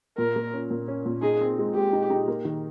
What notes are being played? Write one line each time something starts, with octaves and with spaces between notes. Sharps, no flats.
A#2 A#4
A#3
C#4
A#2
C#4
A#2
D#4 G#4
C4
G#3
G#3 G4
D#4
D#4
A#3
D#3